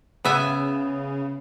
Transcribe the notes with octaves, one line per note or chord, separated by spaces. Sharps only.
C#3 B3 E5 G#5